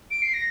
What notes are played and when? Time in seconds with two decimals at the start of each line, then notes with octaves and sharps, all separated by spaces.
0.11 D7
0.22 C7
0.34 A#6